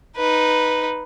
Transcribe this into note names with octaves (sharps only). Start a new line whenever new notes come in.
D#4 B4